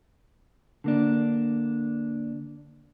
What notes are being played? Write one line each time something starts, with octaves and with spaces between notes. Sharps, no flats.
D3 A#3 D4